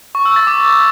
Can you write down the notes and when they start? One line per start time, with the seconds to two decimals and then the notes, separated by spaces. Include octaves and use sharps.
0.15 C#6
0.25 E6
0.36 A6
0.47 D6